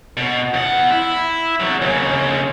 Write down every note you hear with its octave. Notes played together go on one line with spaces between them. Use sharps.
B2
E2 F#5
E4
E2 F#3
D#2 C#3